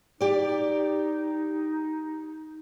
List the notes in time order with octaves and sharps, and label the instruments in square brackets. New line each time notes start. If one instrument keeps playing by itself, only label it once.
[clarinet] D#4 [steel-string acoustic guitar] G4 D5